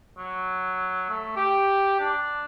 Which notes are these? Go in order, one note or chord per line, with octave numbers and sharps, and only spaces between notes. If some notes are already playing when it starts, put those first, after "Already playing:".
F#3
A3
G4
D4